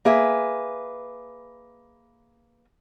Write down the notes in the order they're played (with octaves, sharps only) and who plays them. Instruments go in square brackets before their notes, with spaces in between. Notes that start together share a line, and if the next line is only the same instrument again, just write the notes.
[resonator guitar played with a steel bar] A#3 G#4 B4 E5